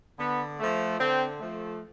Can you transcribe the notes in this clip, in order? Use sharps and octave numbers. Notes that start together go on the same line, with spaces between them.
D3 B3
F3 A3
D3 C4
F3 A3